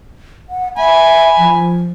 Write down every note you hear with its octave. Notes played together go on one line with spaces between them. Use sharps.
F#5
E5 G#5 B5
F3